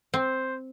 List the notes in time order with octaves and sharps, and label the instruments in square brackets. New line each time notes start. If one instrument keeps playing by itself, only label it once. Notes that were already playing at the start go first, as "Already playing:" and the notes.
[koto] C4 [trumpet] C5